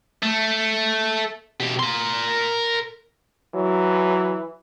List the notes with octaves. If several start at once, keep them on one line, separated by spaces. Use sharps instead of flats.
A3
B2 G4
A#4 C6
E3 F#3